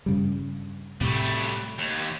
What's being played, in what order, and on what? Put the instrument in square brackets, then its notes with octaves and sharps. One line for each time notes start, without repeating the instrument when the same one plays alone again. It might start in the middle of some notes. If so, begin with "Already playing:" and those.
[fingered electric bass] G2 C#3 G3
[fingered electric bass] A2 C3 [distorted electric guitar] G3 A3
[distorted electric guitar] D#2